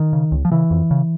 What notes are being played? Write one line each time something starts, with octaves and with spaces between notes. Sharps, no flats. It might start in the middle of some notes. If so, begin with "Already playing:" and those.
Already playing: D#3
C#3
C#2
F3
C#3 E3
F2
C#3